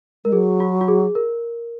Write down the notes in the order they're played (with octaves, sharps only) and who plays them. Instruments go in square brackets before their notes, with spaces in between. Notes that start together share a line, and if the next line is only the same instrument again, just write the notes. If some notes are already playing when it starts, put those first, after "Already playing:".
[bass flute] G#3 [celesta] A#4
[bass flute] F#3 [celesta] G#4
[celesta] F#4
F#4
G#4
A#4